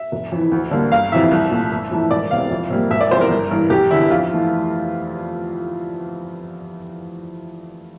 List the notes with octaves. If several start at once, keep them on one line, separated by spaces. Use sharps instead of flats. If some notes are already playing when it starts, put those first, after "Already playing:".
Already playing: E5
F1
F2 E3
D2
D3 G3 A#3
G1 F5
F2 C3 E3 E5
C2
A#2 A3
G1
F2 E3 A3
E1 D5
E2 C3 E3 F5
F2
C3 G3 A#3
E1 E5
D5
E2 C3 F3 C5
A#4
G1
G2 E3
F1 G4
E2 D3 E4
F2 F4
E3 A3